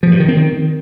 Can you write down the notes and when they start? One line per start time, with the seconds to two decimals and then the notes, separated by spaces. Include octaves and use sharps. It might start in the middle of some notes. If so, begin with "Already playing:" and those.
0.03 F3
0.11 G2
0.20 D#3
0.28 C4
0.37 D#3